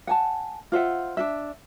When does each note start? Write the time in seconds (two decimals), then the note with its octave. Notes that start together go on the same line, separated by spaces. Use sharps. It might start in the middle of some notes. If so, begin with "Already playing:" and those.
0.07 F#5 G#5 A5
0.72 F4 C5 E5 F#5
1.17 D4 F4 E5